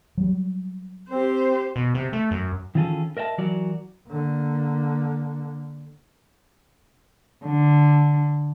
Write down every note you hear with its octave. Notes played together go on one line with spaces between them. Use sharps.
F#3 G3
C4 G4 C5
B2
C3
A3
F#2
D#3 E3 C#4 F4 G#4 A4
A#4 D#5 E5 F#5 A5
E3 F#3 F#4 A#4 D5
D3 A#3
D3